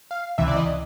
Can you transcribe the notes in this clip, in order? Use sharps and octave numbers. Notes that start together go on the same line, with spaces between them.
F5
C#2 C3 E3 E5
D5
D#5